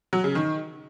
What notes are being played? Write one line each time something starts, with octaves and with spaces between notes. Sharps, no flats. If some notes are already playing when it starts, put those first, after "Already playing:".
F#3
C#3
D#3